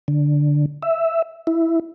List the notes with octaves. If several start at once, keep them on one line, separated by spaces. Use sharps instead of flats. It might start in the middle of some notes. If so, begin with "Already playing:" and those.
D3
E5
E4